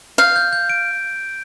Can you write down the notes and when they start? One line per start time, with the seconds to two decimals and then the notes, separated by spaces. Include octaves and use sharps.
0.18 F5 G6
0.36 G6
0.53 G6
0.70 D7